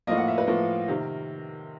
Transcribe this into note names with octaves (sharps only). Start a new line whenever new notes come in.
A2 F3 A#3 D#5
F#5
E5
B4
A2 F3 A#3 A#4
C3 D#3